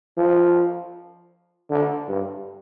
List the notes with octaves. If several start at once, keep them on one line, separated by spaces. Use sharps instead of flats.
F3
D3
G2